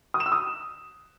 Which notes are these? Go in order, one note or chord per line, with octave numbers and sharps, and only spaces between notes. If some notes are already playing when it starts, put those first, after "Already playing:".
D#6
E7
E6
D#6